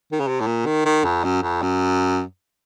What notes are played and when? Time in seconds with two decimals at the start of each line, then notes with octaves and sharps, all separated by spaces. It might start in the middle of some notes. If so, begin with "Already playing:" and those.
0.12 D#3
0.20 C#3
0.28 C3
0.40 A2
0.46 A#2
0.66 D#3
0.85 D#3
1.04 F2
1.24 F#2
1.43 F2
1.62 F#2